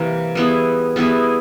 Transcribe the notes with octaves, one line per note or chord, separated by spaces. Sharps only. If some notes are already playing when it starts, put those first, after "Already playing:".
Already playing: C3 E3 G3 A#3
G3 B3 E4 G#4
G3 B3 E4 G#4